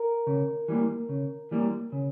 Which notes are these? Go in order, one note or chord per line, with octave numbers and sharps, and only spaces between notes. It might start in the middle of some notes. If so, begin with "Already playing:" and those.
Already playing: A#4
C#3
E3 G3 A#3
C#3
E3 G3 A#3
C#3